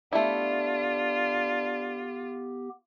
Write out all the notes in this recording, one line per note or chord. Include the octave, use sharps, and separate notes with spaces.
A3 B3 D4 E4 F4 G4